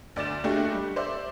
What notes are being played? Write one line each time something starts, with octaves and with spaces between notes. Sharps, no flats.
D2 D5 A6 E7
G#3 A3 D4 F#4 G4 A4
G3
C5 D5 E5